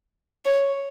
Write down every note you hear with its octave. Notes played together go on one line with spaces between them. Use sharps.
C#5